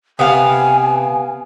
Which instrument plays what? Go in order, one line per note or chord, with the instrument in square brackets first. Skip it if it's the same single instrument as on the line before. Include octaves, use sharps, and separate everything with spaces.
[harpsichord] C3 [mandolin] B3 F5 [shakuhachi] G#5